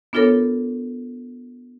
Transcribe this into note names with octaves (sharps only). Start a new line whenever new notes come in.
B3 D4 F4 A4 A#4 C#5